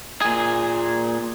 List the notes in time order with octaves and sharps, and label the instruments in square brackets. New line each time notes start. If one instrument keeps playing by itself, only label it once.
[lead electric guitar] A#2 G#4